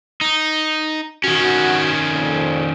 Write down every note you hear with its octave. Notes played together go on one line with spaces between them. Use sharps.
D#4
D#3 C#4 F#4
F2 A#2